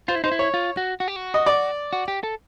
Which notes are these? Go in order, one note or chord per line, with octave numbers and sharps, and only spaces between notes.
F4 C5
E4
D#4 C5
E4
C#5
F4
F#4
F#4
G4
F#4
D#5
D5
F#4
G4
A4